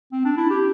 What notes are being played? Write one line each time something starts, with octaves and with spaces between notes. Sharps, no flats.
C4
D4
E4
G4